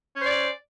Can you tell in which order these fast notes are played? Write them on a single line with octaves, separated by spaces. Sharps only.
C#4 C5 D5